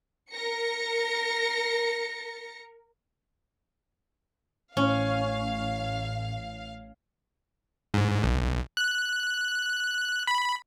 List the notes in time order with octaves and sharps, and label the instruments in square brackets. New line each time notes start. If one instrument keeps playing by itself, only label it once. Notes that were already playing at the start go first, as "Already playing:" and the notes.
[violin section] A#4 A#6 C#7
[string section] A1 F5 [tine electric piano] A2 [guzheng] C#4
[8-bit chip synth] G#2
B1
F#6
B5